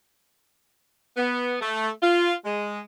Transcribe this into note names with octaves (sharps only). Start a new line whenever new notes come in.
B3
A3
F4
G#3